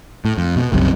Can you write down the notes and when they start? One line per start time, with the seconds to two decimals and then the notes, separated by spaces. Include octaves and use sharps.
0.25 A2
0.38 F2
0.56 B2
0.72 F#1 C2 F#2 C3